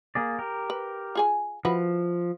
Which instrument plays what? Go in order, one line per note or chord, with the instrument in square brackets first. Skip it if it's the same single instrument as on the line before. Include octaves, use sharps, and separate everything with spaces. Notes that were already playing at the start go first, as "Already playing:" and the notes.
[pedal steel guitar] A#3 G#4 D5
G4 A#4
[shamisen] B4
F4 G#4 G#5
[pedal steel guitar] F3 [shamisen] E4 F#4 B4